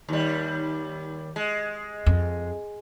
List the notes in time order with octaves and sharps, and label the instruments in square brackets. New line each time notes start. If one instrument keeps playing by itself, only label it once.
[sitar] D#2 G3
G#3
[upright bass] F2